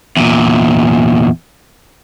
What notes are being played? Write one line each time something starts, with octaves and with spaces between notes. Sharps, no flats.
E2 A#2